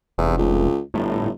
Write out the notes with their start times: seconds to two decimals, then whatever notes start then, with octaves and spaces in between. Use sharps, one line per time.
0.18 F1 E2
0.38 C#2
0.94 G1 A2